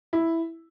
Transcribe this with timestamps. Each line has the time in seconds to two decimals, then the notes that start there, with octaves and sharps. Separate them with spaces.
0.13 E4